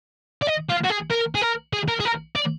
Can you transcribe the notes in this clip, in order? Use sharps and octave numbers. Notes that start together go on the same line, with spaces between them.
D5
D#5
F4
F#4
G#4
A#4
G#4
A#4
G#4
A#4
G#4
A#4
D5